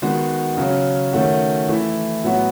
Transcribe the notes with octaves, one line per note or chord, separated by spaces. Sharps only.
D#3 G#3 B3 F#4
C#3 F#3 C#4
D#3 A3 C#4 F#4
E3 A3 E4
A2 F#3 B3 F#4